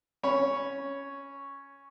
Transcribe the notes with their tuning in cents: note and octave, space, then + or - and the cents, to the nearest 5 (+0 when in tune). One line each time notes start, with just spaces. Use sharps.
C#4 +0 C#5 +0 B5 +0